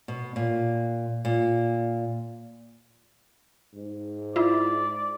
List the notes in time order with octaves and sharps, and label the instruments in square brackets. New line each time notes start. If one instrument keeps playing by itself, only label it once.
[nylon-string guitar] B2
A#2
A#2
[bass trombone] G#2
[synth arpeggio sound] E4 F4 [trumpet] D5